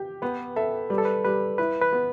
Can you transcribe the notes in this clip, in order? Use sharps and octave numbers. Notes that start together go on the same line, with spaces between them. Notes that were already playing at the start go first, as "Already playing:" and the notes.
Already playing: G4
B3 B4
A4 E5
G3 B4
A4
B4
G3 B4
E4 B4
B4
B3